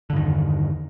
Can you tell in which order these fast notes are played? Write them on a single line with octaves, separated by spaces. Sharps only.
D3 G2 D#3 E2